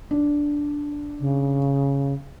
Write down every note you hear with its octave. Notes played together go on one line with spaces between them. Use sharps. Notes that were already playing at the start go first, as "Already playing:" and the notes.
D4
C#3